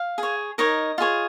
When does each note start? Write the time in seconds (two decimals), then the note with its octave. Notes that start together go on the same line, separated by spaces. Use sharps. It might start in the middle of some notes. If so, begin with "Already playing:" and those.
Already playing: F5
0.18 G#4 C#5
0.58 D#4 A#4 C#5 D#5
0.98 F4 G#4 C#5